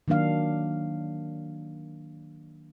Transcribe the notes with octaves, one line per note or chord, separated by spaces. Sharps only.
D#3 F#3 A#3 D4 F5